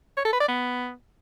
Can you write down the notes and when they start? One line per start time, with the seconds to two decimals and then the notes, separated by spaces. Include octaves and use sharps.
0.17 C#5
0.25 A4
0.33 B4
0.40 D5
0.48 B3